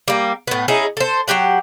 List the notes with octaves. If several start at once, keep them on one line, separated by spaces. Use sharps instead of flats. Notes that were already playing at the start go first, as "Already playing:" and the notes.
G3 A#3
A2 B3
C#4 D#4 E4 G#4
A4 C5
F#3 D#4 G4 F#5